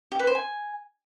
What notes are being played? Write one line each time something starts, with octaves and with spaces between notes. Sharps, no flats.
G4
B4
C5
G#5